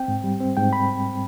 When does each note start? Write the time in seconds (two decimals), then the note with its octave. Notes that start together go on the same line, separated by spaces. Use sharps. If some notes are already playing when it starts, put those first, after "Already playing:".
Already playing: C4 G5
0.08 G#2
0.24 G3
0.40 C4
0.57 G#2 G5
0.73 B5